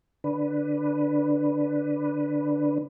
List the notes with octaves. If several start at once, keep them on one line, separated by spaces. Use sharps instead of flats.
D3 D4 B4